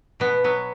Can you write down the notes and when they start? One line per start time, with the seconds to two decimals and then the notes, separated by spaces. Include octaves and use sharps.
0.20 B2 B3
0.44 F#3 B3